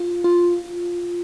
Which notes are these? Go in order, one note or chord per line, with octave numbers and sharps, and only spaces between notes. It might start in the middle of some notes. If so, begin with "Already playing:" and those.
Already playing: F4
F4